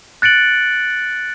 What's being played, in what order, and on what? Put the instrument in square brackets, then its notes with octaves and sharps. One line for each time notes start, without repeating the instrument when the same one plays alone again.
[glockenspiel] F#6 A6 C#7 D7 F#7